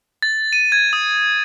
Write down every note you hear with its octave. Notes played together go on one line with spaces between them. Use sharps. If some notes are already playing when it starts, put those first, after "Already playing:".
A6
D#7
G#6
D#6